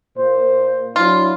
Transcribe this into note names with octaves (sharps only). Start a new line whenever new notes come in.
A#2 A#3 C5
F#3 D4 E4 F4